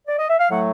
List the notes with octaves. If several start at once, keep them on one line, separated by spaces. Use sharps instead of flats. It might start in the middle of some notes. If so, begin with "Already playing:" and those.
D5
D#5
E5
F5
A2 F#3 A3 F#5